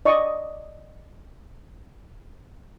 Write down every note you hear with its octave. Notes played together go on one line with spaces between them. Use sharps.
D5 D#5 C#6 D#6